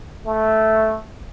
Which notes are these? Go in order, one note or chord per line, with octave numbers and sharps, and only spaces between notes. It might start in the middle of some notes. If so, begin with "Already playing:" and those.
A3